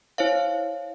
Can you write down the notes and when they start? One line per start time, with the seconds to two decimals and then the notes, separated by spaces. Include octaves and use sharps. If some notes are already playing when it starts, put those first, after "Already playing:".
0.18 E4 C5 C#5 F5